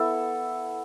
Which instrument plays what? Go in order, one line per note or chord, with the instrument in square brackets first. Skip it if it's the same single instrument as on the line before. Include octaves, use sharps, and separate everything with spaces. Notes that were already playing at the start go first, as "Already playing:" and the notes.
Already playing: [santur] B3 E4 A4